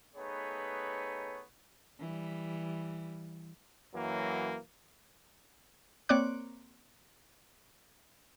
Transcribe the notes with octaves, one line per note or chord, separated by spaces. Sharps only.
A3 B3 D#4 G#4 B4 C#5
E3 G3
F#2 E3 F#3 A#3
A#3 C4 C#5 D5 D6 F#6